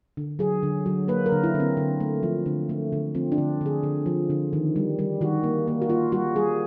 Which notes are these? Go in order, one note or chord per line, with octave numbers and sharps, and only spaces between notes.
D3
F#3 G#4
D3
F#3
A#3 B4
A#4
D3
E4
D3 C4
D3
A3
F3
D3
A3
D3
F3 C4
D4
D3
D3 G#4
D3
F3
D3
D#3
G3
G3
D#3 F#4
A#3
A#3
F#4
A#3 F4
G3 F#4
G3 G#4